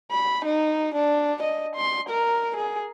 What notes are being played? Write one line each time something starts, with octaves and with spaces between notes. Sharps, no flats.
B5
D#4
D4
D#5
C6
A#4
G#4